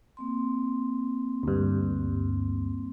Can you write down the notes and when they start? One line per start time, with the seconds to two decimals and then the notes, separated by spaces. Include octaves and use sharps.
0.17 A#3 C4 C6
1.43 D2 G2